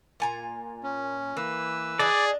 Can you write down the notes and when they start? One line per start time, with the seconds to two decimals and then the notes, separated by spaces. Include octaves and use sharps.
0.20 A#2 G#5 A#5
0.83 C#4
1.37 E3 A#3 B4 E6
1.99 D4 G#4 D5 D#5